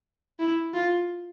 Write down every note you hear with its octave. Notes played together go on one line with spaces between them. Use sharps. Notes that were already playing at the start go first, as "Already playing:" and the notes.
E4
F4